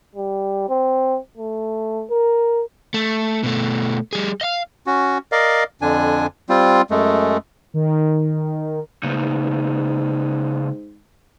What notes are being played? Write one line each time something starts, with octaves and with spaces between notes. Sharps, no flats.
G3
C4
A3
A#4
A3
B2 A3
G3 G#4
D#5 F5
C#4 F#4
A#4 D5 D#5 F5
F2 D3 D4 G#5
G3 C4 F4
F#2 G#3 A3
D#3
G#2 C#3 A#3 D#4